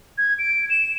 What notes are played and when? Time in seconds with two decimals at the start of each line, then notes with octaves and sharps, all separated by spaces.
0.17 G#6
0.38 D7
0.69 E7